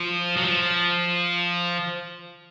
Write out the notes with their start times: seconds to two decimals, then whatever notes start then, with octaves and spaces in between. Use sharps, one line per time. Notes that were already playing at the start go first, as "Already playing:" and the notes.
Already playing: F3
0.37 F#3
0.45 F3